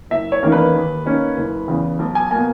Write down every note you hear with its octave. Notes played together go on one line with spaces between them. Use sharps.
F#1 E5
C#5
E2 D#3 A#3 C#4
B4
D#2
D#3 A#3 C#4
F#1
E2 C#3
B1
G#5
B2 A#3 G#5